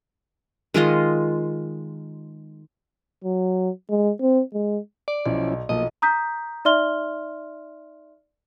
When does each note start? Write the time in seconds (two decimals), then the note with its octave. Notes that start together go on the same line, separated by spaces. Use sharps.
0.74 D#3 G#3 F4 D#5
3.24 F#3
3.90 G#3
4.20 C4
4.53 G#3
5.08 D5
5.26 B1 F3 C#4 E4
5.69 B1 F3 A#3 D#5
6.02 A#5 D#6 G6 B6
6.65 D#4 D5 E5 C6 F6 G7